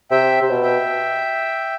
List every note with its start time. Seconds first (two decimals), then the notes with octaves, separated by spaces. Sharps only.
0.11 C3 E5 G5
0.42 C3
0.50 B2
0.63 E5 G5